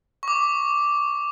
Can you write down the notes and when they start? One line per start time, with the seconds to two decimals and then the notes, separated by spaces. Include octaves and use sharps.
0.23 C#6
0.28 D6